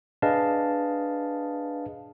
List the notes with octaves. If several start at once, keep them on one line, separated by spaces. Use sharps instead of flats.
D4 G#4 B4 D#5 F5 A5